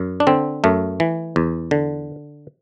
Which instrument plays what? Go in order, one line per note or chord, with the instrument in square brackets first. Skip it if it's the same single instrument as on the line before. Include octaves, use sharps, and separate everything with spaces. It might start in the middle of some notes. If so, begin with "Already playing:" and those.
Already playing: [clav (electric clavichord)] F#2
D4
D3 C4
F#2 A3
E3
E2
D3